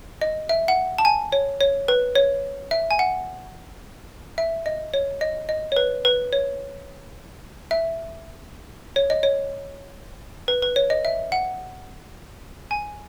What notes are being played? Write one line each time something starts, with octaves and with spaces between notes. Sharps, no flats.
D#5
E5
F#5
A5
G#5
C#5
C#5
B4
C#5
E5
G#5
F#5
E5
D#5
C#5
D#5
D#5
C#5
B4
B4
C#5
E5
C#5
D#5
C#5
B4
B4
C#5
D#5
E5
F#5
G#5